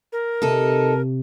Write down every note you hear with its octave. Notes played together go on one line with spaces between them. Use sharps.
A#4
C3 D#4 A4